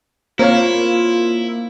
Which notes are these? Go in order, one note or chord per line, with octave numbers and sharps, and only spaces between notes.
A#3 C4 E4 F4 C#5 F5